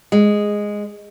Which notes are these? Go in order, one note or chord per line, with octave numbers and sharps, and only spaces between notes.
G#3